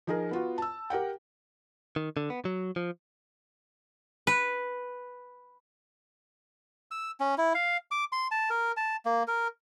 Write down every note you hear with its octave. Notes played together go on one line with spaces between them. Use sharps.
F3 D#4 G#4 A#4
B3 F4 F#4
A5 E6
G4 A#4 F#5 G5
D#3
D3
B3
F#3
F3
B4
E6
C#4
E4
F5
D6
C6
A5
A#4
A5
A#3
A#4